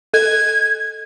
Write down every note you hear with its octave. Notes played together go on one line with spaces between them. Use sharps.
A4 G#6